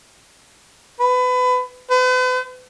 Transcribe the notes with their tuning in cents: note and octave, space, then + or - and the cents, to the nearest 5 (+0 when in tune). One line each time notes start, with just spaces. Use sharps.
B4 +25
B4 +45